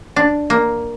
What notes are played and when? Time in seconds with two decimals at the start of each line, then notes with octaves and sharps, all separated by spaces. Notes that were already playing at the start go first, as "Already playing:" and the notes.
0.16 D4
0.50 A#3